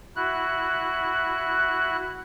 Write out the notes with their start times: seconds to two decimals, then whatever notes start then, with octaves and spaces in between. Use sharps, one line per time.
0.16 E4 F#4 F#6